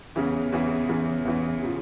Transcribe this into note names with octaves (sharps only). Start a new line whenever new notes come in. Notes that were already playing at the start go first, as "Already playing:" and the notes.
E2 C#3 E3
E2 C#3 E3
E2 C#3 E3
E2 C#3 E3
C#3 F3